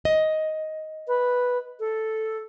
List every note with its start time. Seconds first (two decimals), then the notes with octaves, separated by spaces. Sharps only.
0.05 D#5
1.08 B4
1.80 A4